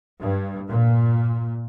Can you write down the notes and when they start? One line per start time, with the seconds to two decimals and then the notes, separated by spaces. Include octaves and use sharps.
0.21 G2
0.69 A#2